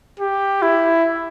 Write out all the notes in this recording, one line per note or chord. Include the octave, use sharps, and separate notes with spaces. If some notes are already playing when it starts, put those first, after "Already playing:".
G4
E4